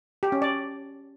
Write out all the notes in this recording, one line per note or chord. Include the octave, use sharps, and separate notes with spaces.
G4
C#4
D5